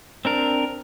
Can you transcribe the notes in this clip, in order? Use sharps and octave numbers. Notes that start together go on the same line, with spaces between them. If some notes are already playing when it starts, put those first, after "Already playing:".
C4 D4 A#4